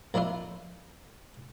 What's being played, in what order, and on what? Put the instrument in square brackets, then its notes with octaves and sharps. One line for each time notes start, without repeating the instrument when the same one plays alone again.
[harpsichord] F2 A#3 D4 E4 F4